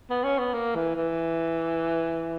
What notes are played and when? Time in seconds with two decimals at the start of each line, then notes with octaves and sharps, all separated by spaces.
0.10 B3
0.24 C#4
0.39 B3
0.54 A#3
0.75 E3
0.96 E3